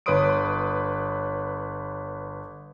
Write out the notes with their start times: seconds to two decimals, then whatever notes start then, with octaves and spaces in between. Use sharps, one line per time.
0.06 G1 B4 C#5 C6 D#6 D7